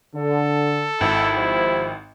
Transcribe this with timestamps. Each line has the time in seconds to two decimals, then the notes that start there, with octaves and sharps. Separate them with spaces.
0.15 D3 A4
1.01 G#1 E4
1.37 F3 G4 C5